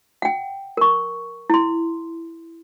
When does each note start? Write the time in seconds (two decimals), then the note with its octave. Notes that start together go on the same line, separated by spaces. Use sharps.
0.22 F#5 G5
0.77 A#4 C#6
1.50 E4 C6